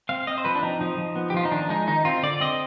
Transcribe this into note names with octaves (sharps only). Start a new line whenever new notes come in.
C4 F5
C4 D#5
C5
F3 B4
D4
C4 D#4
F3 D#4
F3
B3
G4
F3 F4
D#4
D#3 D4
G#3 D#4
D#3 D#4
C4 F4
D3 D5
C4 D#5